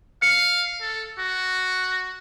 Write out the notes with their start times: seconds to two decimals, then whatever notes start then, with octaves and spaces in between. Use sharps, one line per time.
0.22 F5 C#7
0.81 A4
1.19 F#4